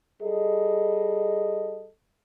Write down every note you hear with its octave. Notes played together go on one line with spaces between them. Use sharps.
G3 G#4 A4 D#5